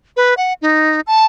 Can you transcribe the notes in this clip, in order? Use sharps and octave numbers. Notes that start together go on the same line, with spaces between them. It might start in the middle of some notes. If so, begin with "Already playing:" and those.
B4
F#5
D#4
A5